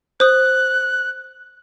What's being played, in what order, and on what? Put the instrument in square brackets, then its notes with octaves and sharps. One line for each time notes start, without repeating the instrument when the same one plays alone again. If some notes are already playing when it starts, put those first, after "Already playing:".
[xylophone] C5 D#6 [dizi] F#6